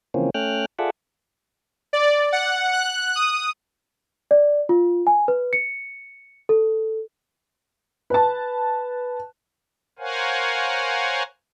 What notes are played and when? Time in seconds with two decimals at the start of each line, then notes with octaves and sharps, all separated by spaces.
0.14 C#3 E3 F3 A#3 C4 C#4
0.34 A3 C#4 G5 F6 F#6
0.79 F4 G#4 A4 D5 E5 F#5
1.93 D5
2.32 F#5
2.73 F#6
3.15 D#6
4.31 D5
4.69 F4
5.07 G#5
5.28 B4
5.53 C#7
6.49 A4
8.10 B4 A5
9.99 A#4 C5 C#5 F5 F#5 G#5